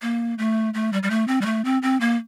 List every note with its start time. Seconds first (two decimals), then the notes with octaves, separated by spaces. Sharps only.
0.02 A#3
0.38 A3
0.74 A3
0.93 G3
1.03 G3
1.10 A3
1.28 C4
1.41 G3
1.46 A3
1.65 C4
1.83 C4
2.01 A#3